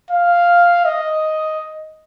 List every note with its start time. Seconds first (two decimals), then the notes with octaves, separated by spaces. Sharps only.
0.11 F5
0.85 D#5